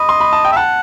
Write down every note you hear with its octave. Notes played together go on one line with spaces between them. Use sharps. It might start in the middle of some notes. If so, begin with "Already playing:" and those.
Already playing: D#5 B5
C6
B5
A5
G5
E5
F#5 A5